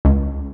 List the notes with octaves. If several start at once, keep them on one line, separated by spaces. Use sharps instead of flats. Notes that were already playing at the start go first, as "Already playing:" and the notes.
C#2